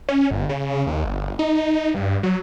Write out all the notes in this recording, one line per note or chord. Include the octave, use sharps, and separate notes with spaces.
C#4
G1
C#3
D#2
G1
D#4
G2
F#3